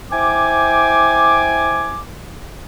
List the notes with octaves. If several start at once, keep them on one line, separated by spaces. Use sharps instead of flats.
E4 C5 G5 G#5 D6